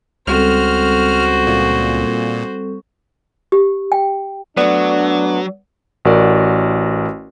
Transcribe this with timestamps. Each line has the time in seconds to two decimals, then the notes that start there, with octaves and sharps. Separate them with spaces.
0.27 C#2 G3 C4 F#4 A4 C5 F6
1.47 A#2
3.52 G4
3.92 G5
4.57 F#3 A3 B3 D4 D5
6.05 A1 F#4 A#4 D5